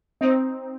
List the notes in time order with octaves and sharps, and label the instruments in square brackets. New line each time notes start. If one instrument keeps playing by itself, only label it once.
[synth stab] C4 D#4